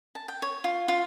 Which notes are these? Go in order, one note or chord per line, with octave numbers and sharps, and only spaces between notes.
A5
G5
C#5
F4
F4